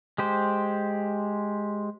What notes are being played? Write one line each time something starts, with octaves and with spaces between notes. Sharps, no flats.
G#3 G4 C5